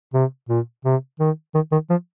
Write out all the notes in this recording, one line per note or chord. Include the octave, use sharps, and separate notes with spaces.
C3
A#2
C3
D#3
D#3
D#3
F3